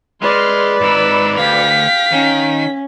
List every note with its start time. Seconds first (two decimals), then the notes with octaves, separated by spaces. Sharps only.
0.22 G#3 B4 D5 C6 F6
0.81 G#2 A#4 B5 E6
1.38 D2 F5 G5 B6
2.12 D#3 C#4